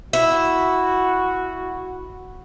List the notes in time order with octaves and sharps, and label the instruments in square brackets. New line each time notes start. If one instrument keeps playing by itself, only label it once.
[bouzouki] E4 [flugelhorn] F#4